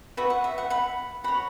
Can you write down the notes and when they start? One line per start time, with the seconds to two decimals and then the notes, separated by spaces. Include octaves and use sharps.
0.17 F#4 B4 E5
0.30 F#5
0.44 E5
0.58 F#5
0.70 F#5 B5
1.24 F#4 C#5 F#5 B5